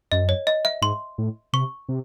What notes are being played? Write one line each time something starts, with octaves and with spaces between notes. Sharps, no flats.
F#2 D#5
C#5
D#5
E5
G#2 C6
A2
C3 C#6
C3